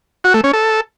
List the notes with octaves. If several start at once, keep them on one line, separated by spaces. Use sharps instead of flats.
F#4
A3
C#4
A4